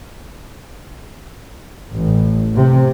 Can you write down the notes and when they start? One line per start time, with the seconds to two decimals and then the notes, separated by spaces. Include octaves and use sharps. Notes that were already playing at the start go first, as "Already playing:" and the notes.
1.94 A1
2.56 C3